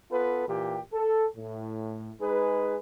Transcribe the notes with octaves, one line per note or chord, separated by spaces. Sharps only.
B3 F4 A4 B4
A#2 E3 G4
A4
A2
G#3 D#4 G#4 B4